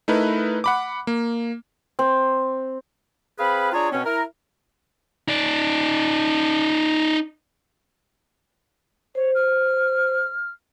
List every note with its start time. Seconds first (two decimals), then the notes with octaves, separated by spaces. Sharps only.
0.08 A3 D#4 E4 A#4 B4
0.64 F#5 B5 D6
1.07 A#3
1.99 C4
3.38 C4 G#4 B4 F5 B5
3.73 D4 F4 G#4 C#5 A#5
3.92 B2 C4 C#4
4.04 E4 A#4
5.28 D#4 D5
9.15 C5 C#5
9.35 F6